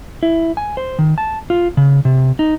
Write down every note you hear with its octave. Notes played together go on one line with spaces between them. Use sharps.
E4
G#5
C5
D#3
A5
F4
C#3
C3
D#4